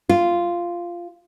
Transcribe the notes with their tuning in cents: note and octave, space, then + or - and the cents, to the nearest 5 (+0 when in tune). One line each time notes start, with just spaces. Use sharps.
F4 -10